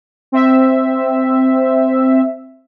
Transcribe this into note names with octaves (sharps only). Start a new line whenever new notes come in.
C4 E5